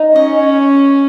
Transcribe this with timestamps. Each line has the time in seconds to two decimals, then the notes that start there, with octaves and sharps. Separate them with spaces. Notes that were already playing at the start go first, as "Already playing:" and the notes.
Already playing: D#4
0.16 C#4 D#5